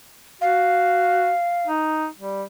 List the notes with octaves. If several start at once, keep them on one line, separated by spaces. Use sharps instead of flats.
F#4 F5
D#4
G3